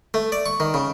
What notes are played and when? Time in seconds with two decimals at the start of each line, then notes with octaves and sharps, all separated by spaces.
0.14 A3
0.32 D5
0.46 C#6
0.60 D#3
0.74 C#3